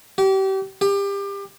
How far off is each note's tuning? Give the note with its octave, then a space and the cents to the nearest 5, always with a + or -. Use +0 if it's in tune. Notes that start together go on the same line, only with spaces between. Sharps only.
G4 -30
G4 +30